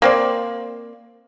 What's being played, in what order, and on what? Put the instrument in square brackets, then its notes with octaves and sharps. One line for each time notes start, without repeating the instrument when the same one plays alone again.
[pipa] A#3 C4 D5